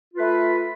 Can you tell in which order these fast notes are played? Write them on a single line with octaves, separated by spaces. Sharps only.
F4 B4 A3